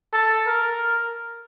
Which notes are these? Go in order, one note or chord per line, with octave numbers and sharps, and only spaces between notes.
A4
A#4